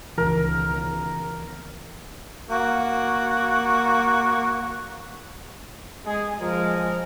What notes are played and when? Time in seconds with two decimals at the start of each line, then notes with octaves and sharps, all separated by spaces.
0.18 C#2 B2 D#3 E3 A#4
2.50 A#3 F#4
6.05 G#3 G#4
6.40 F3 G#3 A#4